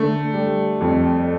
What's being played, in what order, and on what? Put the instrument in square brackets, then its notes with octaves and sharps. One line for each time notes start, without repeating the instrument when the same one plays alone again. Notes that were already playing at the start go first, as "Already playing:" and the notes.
Already playing: [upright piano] D3 [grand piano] A3
[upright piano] G3
F2